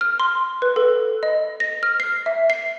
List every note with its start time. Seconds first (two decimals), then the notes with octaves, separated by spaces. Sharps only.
0.01 F6
0.20 C6
0.62 B4
0.76 A4
1.23 D#5
1.60 A#6
1.83 F6
2.00 C7
2.26 E5
2.50 C7